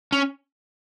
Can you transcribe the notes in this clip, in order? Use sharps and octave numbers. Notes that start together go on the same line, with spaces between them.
C#4